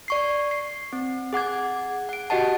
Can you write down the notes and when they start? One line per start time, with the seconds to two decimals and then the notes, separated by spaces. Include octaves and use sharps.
0.08 D5 C#6 C7
0.51 C7
0.93 C4
1.33 G#4 F#5 D6 G#6
2.09 F#5 D7
2.30 F#4 G4 D#5 F#5 A5